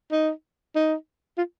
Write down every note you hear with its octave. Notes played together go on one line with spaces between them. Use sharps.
D#4
D#4
F4